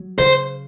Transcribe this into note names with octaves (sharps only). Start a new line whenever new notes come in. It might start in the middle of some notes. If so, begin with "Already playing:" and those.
Already playing: F#3
C#3 C5